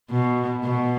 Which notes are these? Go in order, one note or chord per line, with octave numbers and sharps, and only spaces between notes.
B2
B2